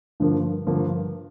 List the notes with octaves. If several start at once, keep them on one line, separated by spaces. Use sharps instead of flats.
G2 D3 F3 A#3
G2 D3 F3 A#3